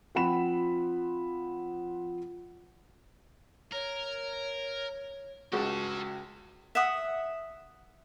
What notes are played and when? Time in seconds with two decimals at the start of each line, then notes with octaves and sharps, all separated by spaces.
0.15 F3 C4 F#5 B5 E7
3.72 A#4 C#5
5.52 C#2 G#3 F#4 G4 A5
6.75 E5 F#5 D#6